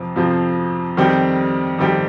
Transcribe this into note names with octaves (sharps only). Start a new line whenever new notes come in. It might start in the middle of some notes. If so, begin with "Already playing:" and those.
Already playing: F2 C3 F3 C4 F4
F2 C3 F3 C4 F4
F2 D#3 G3 C4 G4
F2 D#3 G3 C4 G4